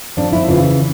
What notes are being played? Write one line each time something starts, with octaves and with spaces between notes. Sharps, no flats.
F2 D4
E4
C#3 E3 F4